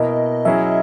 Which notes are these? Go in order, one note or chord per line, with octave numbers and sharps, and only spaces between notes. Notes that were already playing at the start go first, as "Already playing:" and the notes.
Already playing: B2 A#3 E4 A#4 D#5
F#3 C#4 E4 G#4 E5